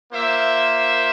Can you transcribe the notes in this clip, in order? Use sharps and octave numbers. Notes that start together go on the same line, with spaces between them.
A#3 F4 C5 E5